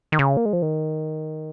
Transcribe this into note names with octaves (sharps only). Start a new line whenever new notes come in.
D#3
C#3
A#3
G#3
F3
D#3